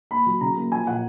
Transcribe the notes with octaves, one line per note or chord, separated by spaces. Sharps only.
A#3 B5
F#3
C#3 A#5
A#3
F3 G#5
A#2 F#5